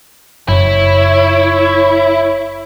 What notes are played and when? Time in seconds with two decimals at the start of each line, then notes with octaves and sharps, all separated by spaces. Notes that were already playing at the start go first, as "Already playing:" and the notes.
0.48 F#1 E4 C#5